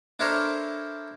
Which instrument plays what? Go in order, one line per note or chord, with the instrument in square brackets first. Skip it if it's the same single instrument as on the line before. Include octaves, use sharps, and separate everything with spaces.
[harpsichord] D4 E4 A4 A#4 C5 C#5